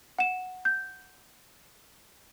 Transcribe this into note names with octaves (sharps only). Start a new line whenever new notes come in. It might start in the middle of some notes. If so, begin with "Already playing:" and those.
F#5 E7
G6